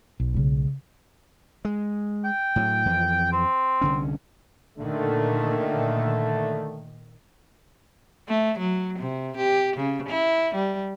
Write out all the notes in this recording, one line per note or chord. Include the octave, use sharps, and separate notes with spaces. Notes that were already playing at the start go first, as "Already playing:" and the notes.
B1
C#3 G#3
G#3
G5
A2 F#3
F2 E3 F3
C4
C2 D3 C#4
A#2 D3 D#3 A3
A3
F#3
C3
G4
C#3
E4
G3